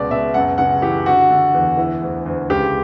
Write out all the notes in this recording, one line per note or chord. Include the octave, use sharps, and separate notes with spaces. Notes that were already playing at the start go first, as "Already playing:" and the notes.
Already playing: C#2 B2 D5
B2 E5
F#2 F#5
C#3 F#5
E3 G4
D3 F#4
D3
E2
E3
D2
D2
C#2 G4